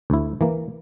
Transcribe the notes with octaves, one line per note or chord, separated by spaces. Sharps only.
D2 E4
E3 A#3